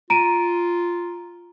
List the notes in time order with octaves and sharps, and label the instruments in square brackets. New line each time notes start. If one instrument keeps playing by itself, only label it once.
[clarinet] F4 [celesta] A#5 D7 D#7